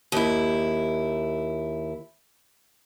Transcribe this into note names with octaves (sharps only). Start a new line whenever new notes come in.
D#2 E4